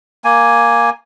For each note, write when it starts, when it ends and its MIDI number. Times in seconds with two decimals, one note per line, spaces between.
0.24 0.90 58
0.24 0.90 80